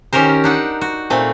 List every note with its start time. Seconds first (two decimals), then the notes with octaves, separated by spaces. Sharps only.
0.13 D#3 C#4 G4 A#4 C5
0.44 D4 D#4 F#5
0.81 F#4
1.10 A#2 A3 C4